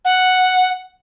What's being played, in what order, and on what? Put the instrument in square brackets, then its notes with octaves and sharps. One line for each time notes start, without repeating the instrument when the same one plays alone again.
[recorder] F#5